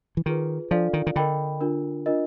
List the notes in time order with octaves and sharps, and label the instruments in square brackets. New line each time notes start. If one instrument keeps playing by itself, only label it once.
[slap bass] E3
[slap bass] D#3 [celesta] F4 G#4 B4
[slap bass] F3 [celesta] D4 F4 A4 D5 F5
[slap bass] D#3
D#3
[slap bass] D3 [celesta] A#4 D#5 G5 B5
[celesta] D4 F4 A#4
D4 F4 A#4 D#5